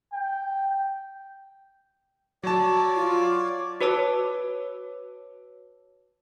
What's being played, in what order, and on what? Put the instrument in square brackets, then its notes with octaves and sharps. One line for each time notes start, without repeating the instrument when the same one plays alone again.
[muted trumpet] G5
[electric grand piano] F#3 A5 [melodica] C#5 D5 D6
[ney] F4
[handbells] F#4 B4 C#5 A5 D6 E6